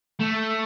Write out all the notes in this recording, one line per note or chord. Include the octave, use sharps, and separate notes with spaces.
A3